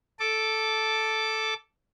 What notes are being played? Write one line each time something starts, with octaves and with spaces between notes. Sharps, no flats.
A4 D6